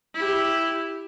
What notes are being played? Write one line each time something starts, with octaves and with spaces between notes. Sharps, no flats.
E4 G4